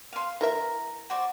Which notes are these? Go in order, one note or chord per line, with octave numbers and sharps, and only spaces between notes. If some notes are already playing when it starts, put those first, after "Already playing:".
F5 C6
E3 A#4 E5 A#5
F#4 C5 D5